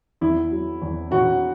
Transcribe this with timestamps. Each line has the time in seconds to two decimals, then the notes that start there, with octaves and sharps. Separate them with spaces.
0.21 E2 E4
0.51 F#3
0.82 E2
1.11 E1 F#4